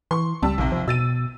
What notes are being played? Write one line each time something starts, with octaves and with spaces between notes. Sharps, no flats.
E3 C6 C#6
C#2 G3 A5 E6
A#1 D#2 C3
F3
B2 E6 A6 D#7